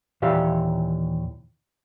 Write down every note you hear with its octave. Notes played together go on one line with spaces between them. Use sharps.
D#2 A#2 E3 G4 E5 F5